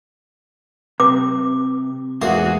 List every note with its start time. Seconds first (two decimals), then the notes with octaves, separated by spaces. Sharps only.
1.00 C3 D6
2.22 E2 G#2 A#3 F#4 G#4 C6